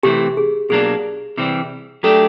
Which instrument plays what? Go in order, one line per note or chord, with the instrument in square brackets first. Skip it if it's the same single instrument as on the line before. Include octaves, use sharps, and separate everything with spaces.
[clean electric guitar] C3 E3 A3 C4 [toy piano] G4
[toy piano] G#4
[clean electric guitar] B2 F#3 A#3 D4 [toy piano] G#4
[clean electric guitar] C3 E3 G3 C4
[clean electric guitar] F#3 A3 D4 G4 [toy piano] A4